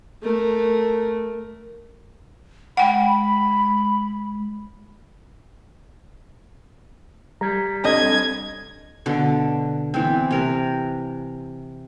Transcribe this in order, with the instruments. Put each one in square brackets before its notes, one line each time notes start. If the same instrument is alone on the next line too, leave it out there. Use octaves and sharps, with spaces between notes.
[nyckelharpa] A3 A#4
[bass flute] G#3 [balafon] F#5 G5 [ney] B5
[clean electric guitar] G3 [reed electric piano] A#5 G#6
[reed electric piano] C4 D4 A4 [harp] D#5 [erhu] G#6
[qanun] B2 D3
E3 B3 C4
C3 A#4 B4